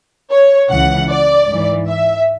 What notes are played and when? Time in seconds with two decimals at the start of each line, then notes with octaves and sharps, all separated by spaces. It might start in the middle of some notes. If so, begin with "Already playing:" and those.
0.31 C#5
0.70 C#2 C#3 E3 F#5
1.09 D5
1.48 G#2 E3
1.88 E5